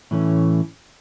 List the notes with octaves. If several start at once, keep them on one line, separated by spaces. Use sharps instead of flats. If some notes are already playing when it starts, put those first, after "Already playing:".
A2 E3 A3 C#4